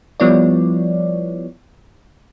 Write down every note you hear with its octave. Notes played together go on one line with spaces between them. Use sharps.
F3 G3 B3 E4 C#5 D5